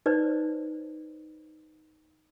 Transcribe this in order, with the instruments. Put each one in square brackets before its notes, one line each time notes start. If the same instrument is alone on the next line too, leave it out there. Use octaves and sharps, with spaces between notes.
[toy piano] D#4 B4 C5 D5